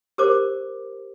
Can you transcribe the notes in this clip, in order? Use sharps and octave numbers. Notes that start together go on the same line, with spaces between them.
G4 A#4 C5 D6